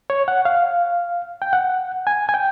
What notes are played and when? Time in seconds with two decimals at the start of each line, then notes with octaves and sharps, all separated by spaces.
0.10 C#5
0.28 F#5
0.45 F5
1.42 G5
1.53 F#5
2.07 G#5
2.29 G#5
2.34 G5